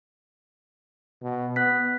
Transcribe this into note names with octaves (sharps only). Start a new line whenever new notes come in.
B2
B3 F#6 B6